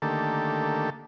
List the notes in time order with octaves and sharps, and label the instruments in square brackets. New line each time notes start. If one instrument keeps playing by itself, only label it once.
[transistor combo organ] D3 D#3 A3 A#3 G4 A4